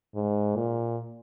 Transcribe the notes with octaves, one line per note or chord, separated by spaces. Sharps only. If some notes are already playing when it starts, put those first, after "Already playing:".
G#2
A#2